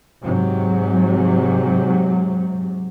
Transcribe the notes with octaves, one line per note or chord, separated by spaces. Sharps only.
G#2 C3 F#3